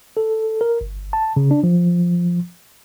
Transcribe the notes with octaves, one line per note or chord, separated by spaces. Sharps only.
A4
A#4
G1
A5
C#3
D4
F3